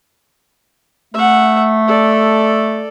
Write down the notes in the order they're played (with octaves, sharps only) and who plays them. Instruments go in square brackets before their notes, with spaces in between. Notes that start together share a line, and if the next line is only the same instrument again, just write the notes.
[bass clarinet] A3 [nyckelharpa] E5 F#5
[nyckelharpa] A4 D5